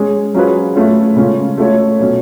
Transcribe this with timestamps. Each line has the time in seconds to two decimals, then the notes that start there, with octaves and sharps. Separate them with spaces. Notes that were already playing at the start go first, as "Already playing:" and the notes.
Already playing: G#3 C#4 G#4
0.34 F#3 C#4 F4 G#4 B4
0.75 A3 C#4 F4
1.16 C#3 G#3 C#4 F4
1.58 A3 F4 A4 C#5
1.99 B2 F#3 C#4